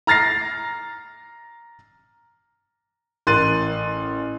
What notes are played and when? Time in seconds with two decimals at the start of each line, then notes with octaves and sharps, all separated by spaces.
0.07 A#5 F6 A6 A#6 C7
3.27 A1 A#4 C6 F#6 A6 D#7